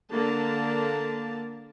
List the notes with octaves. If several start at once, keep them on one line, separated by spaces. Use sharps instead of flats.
D3 A#3 A5